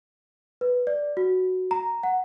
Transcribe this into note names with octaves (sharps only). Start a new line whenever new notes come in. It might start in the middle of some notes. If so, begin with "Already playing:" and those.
B4
D5
F#4
A#5
F#5